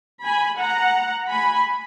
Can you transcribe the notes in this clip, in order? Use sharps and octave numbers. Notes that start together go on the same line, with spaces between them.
G#5 B5
F#5 A#5
G#5 B5